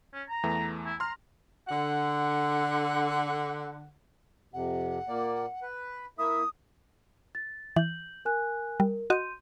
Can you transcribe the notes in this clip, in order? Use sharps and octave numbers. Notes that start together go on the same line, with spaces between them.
C#4
A#5
E2 E3 A3
E4
A#5 C6 F6
D3 F#5
F2 C3 F#5
A#2 A#3 D5
B4
A#3 E4 E5 D#6
A6
E3 G6 F#7
A#4 G#5 F#6
G3 A#4
F#4 D#5 C6 G6 D#7